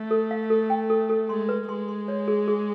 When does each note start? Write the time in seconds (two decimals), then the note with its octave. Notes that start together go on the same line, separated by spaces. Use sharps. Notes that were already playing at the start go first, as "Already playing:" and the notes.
Already playing: A3
0.11 A4
0.31 F5
0.50 A4
0.70 G5
0.90 A4
1.10 A4
1.29 G#3 C6
1.49 B4
1.69 G#3 C6
1.88 C6
2.08 C#5
2.28 G#4
2.48 G#4